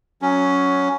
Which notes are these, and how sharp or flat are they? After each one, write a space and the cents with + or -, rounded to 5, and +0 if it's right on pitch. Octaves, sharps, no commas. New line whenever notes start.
F#3 +0 C#4 +10